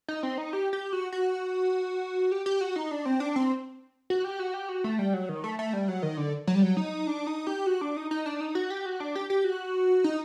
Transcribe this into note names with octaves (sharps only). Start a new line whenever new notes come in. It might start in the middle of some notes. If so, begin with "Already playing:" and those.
D#4
C4
D#4
G4
G4
F#4
F#4
G4
G4
F#4
D#4
D4
C4
D4
C4
F#4
G4
F#4
G4
F#4
A3
G3
F#3
D#3
A3
A3
G3
F#3
D#3
D3
F#3
G3
F#3
D#4
D4
D#4
G4
F#4
D4
D#4
D#4
D4
D#4
F#4
G4
F#4
D4
G4
G4
F#4
D#4